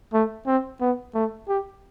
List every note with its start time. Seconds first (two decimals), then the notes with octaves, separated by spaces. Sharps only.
0.14 A3
0.47 C4
0.81 B3
1.15 A3
1.49 G4